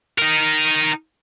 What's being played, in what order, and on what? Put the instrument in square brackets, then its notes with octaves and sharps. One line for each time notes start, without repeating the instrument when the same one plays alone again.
[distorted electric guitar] D#4 A#4